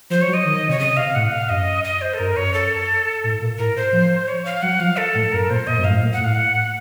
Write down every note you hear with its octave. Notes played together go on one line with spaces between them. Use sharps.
F3 C5
C#5
F#3
D#5
D#3
C3 C#5
C#3 D#5
C3 F5
A2 F#5
F5
F#2 D#5
D#5
C5
A4
F#2 A#4
F#2 C#5
A4
A2
A#2
A2 A#4
A2 C5
F3
C#5
F5
F#3 F#5
F3 F5
A4
A2
F#2 A#4
A#2 C5
A#2 D#5
F#2
F5
A2
A#2
F#5
A2 F5
F#5